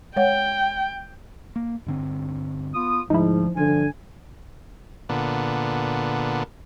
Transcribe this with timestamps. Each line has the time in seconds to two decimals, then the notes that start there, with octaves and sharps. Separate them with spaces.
0.16 G#3 C#5 F#5 G5
1.56 A#3
1.86 G2 D3 C4
2.74 B3 F4 D#6
3.10 D2 G#2 F3 D#4 E4
3.57 G2 D3 F3 G3 G#5
5.09 A#2 D3 B3